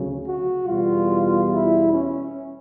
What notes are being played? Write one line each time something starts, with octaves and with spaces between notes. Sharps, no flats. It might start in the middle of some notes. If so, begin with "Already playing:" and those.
Already playing: D2 C#3 F#3
F#4
E2 B2 G3 F4
E4
C#4